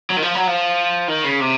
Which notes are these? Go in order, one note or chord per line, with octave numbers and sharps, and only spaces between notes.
F#3
D#3
F3
F#3
F3
D#3
C#3
C3